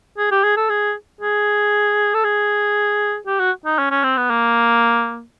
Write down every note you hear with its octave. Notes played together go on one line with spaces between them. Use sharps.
G#4
G4
G#4
A4
G#4
G#4
A4
G#4
G4
F#4
D#4
C#4
C#4
C4
B3
A#3